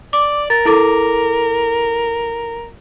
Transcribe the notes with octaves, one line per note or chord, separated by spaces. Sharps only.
D5 D6
A#4 A6
E4 A4 D6